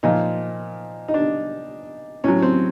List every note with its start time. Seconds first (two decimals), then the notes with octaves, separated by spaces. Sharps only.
0.03 A#2 F3 D#4
1.08 D#4
1.14 D4
2.24 A2 F#3 C#4
2.42 C4